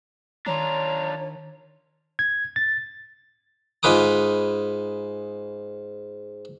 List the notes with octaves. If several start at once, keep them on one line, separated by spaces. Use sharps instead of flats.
D#3 D4 F4 C#5 A#5
G#6
A6
G#2 F4 B4 D6 D#6